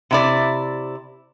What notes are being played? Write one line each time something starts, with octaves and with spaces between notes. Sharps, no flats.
C3 E4 D5